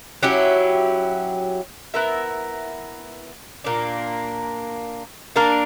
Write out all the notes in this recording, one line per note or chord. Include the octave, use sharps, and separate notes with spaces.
F#3 C#4 E4 G4
B3 E4 A#4 E5
A#2 A#3 D4
A#3 D4 A#4